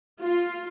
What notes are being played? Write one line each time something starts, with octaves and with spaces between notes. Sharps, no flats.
F4